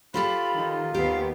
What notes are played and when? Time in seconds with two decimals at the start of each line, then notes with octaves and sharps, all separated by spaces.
0.14 F4 G4 A4 C5 B5
0.51 D#3
0.94 D#2 B3 G4 F5